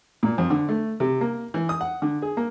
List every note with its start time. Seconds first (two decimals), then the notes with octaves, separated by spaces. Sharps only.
0.23 A#2
0.38 F2
0.50 D3
0.69 A3
1.00 C3
1.21 A#3
1.54 E3
1.69 D#6
1.81 F#5
2.02 D3
2.22 G#4
2.37 A#3